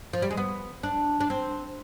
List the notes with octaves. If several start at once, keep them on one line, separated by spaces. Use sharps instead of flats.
F3
G3
G#3
B3
D4
D4
C4